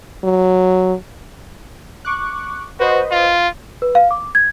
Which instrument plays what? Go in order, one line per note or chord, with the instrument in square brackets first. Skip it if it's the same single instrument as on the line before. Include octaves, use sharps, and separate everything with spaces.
[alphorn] F#3
[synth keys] C#6 D6 F#6
[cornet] F#4 [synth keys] B4 C5 D#5
[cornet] F4
[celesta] B4
F5
D6
G#6